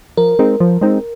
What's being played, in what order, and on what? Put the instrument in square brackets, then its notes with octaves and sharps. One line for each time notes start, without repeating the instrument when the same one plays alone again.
[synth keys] F3 [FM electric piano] A#4
[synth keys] G#3 C4 D#4
F3
G#3 C4 D#4